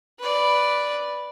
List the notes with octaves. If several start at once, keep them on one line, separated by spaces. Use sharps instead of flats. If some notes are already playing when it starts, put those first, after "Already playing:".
B4 D5